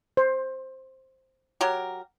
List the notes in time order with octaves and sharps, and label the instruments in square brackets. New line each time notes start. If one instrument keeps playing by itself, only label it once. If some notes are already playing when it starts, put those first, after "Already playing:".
[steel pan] C5
[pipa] F#3 G4 A#4